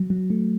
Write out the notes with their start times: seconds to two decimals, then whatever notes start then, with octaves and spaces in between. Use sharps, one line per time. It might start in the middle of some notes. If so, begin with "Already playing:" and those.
Already playing: F#3
0.10 F#3
0.30 A3